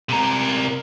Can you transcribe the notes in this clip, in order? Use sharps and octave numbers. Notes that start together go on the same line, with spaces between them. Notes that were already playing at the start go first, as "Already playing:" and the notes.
C3 A#4